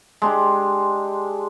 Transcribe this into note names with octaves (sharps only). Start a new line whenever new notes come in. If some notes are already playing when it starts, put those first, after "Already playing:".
G#3 D4 G4